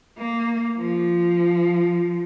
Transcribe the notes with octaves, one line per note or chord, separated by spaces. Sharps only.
A#3
F3